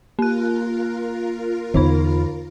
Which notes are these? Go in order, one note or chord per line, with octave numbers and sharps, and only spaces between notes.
A#3 F4 A#4 F#6
E2 D3 D#4 B5